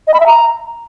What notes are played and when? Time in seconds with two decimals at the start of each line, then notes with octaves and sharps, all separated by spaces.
0.07 D#5
0.14 B5
0.20 E5
0.27 A#5